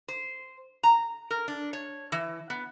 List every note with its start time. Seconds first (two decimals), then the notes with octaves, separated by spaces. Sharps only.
0.08 C5
0.83 A#5
1.30 A#4
1.48 D4
1.73 C#5
2.12 E3
2.50 B3